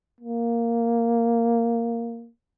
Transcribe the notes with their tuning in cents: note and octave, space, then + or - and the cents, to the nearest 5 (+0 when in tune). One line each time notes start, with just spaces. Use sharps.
A#3 -5